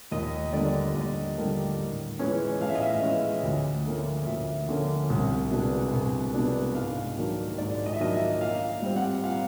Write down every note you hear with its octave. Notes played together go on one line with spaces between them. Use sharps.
D#2 D#5
D3 G3 A#3 D4 D5
D#2 D#5
D3 G3 A#3 D4
A2
E3 G#3 C#4
A2 F5
E5
D#5
E5
E3 G#3 C#4
D2
D3 F3 A#3 C#4
D2 E5
D3 F3 A#3 C#4
C2
B2 G#3 B3 D4
C2
B2 G#3 B3 D4
G#2 F5
D#3 F#3 A#3 D4
G#2 D5
D#5
E5
D#3 F#3 A#3 D4 D#5
E5
A#2 F5
G3 C4
F#5
A#2 F5